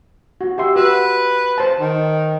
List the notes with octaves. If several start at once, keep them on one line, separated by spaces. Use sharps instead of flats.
F#4
G4 E5 C6
F#4 B4 E6
C5 A5
D#3